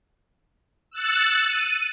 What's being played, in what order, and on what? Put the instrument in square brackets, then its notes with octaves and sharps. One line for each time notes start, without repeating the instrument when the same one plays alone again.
[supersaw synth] E6 F#6 A6 C#7
D#7